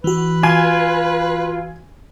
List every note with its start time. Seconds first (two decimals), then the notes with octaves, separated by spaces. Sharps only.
0.04 E3 F#4 B4
0.43 F4 G#5